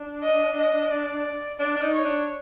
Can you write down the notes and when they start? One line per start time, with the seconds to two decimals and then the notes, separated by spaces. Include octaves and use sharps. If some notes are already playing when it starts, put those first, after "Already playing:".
Already playing: D4
0.23 D#5
0.57 D#5
0.91 D5
1.59 D4 D5
1.76 D4
1.82 D#4
1.93 C#5
2.05 D4